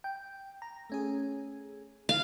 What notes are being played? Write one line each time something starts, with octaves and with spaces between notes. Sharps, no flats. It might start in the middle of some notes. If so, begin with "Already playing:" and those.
G5
A#5
A3 C#4 G#4
F5